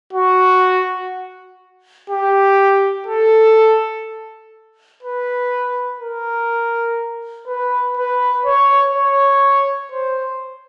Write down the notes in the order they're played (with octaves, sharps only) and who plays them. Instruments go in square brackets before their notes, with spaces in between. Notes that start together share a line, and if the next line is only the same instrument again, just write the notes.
[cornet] F#4
G4
A4
B4
A#4
B4
B4
C#5
C#5
C5